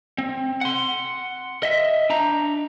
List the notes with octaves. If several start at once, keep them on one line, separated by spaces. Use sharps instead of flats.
C4
F#5 C6
D#5 E5
D4 A#5